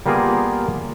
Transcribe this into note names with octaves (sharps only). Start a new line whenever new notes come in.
G3 A#3 B3 F4 G#4 A#4